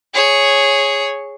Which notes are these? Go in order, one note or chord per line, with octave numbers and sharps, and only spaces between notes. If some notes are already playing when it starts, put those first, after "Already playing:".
G#4 C#5